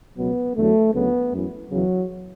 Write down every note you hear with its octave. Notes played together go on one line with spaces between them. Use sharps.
C#2 B2 F#3 B3
E2 D3 F#3 A3
D2 C#3 F#3 B3
F#2 E3
E2 C#3 E3 F#3